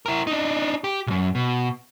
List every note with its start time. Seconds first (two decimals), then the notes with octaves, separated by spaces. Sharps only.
0.06 E4 A#4
0.27 D4 D#4
0.84 G4
1.07 B1 F#2
1.35 B2